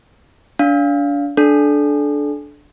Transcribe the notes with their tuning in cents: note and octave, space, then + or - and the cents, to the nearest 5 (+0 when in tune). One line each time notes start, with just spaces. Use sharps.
D4 -30 F5 +0
D4 +0 A4 -30